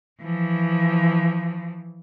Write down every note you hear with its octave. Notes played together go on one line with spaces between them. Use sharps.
E3 F3